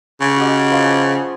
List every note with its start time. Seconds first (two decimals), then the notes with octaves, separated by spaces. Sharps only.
0.21 C#3
0.37 F#4 G4 D#5
0.71 F3 C6
0.84 G#5